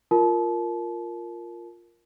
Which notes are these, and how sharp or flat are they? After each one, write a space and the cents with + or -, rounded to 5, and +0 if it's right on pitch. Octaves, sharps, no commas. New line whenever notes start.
F4 +0 A#4 +0 A5 -30